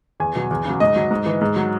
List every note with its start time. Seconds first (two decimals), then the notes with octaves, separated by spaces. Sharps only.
0.20 E2 G#5
0.35 B2 F#3
0.51 E2
0.65 C#3 F#3
0.80 G#2 D#5
0.96 F#3
1.11 G#2
1.26 E3
1.41 G#2
1.56 F#3